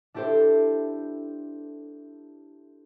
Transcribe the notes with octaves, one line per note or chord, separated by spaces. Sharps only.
D4 E4 G4 A4 C5